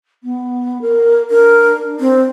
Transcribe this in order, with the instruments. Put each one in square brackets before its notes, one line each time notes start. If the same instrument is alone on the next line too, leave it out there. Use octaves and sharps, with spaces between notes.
[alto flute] B3
A#4
[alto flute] D4 [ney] A#4
[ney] C4